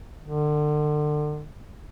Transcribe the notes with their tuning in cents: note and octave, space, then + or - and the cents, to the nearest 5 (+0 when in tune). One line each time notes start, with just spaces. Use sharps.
D3 +35